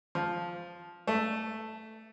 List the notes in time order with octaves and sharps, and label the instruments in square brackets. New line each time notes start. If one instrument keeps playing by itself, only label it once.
[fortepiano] F3
A3